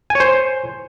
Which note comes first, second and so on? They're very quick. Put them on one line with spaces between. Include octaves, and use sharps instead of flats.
G#5 C#5 C5